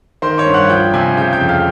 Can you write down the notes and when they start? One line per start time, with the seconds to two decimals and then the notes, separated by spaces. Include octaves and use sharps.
0.22 D#3 C5 C6
0.38 C#5 C#6
0.46 G2
0.54 F#5 F#6
0.70 F3 G5 G6
0.94 C3 G#5 G#6
1.17 C#3 G5 G6
1.33 G5 G6
1.41 F2
1.49 F5 F6